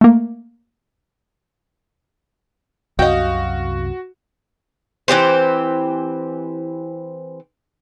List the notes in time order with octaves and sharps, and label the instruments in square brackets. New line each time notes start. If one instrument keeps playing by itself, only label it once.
[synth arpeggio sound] A3 A#3
[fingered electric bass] C2 F#2 C3 [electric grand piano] F#4 [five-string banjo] D#5 G5 [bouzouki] F5
[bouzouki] E3 C4 G4 C5